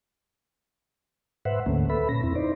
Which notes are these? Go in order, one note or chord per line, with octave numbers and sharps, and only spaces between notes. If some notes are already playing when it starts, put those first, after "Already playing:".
G#2 B4 C5 E5 F#5
D2 G#2 D3 A3 A#3 C#4
A4 B4 E5 B5
A#2 C#4 A#6
F2 C4 E4
D#4 C5 D5